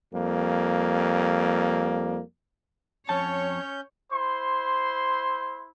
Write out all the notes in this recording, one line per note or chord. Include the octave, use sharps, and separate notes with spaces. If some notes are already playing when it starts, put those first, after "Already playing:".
F2 G3 A#3
F2 C#4 C#5 A5 G6
E4 C5 C6